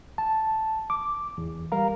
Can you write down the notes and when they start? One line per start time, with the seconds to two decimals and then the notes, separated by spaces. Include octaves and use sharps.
0.18 A5
0.90 D6
1.38 E2
1.72 G3 A#4 F5 A#5